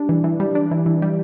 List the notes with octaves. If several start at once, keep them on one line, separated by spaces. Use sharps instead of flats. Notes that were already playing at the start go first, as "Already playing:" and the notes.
Already playing: G3 D4
E3
E3
G3
D4
E3
E3
G3